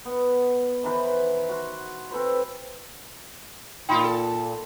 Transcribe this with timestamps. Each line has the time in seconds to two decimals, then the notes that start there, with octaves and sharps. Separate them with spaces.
0.05 B3 F#5
0.83 D#3 E3 B4 C5
1.49 F#4 F#5 C6
2.11 C4 A4 B4 C5
3.89 A#2 D#4 F4 G5 B5 C6
4.04 A4